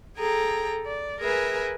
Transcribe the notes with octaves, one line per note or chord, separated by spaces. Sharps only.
G#4 A4 G5 A#5
D5
G#4 A#4 B4 E5 G#5